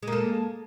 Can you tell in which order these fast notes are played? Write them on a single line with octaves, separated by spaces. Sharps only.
G#3 A#3 A4